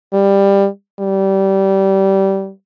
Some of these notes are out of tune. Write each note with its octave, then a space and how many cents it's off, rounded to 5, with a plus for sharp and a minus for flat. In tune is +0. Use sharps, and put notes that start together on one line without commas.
G3 +15
G3 -20